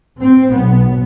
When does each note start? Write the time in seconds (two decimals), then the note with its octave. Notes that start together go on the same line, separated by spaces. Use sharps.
0.20 C4
0.50 B1 B3